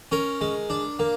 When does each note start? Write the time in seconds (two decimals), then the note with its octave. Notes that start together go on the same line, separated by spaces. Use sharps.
0.12 C#4 A#4
0.41 G#3
0.70 D4
0.99 A#3